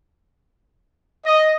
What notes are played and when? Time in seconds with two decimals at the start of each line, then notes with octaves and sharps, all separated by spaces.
1.25 D#5